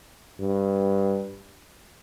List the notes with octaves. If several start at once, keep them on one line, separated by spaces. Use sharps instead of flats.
G2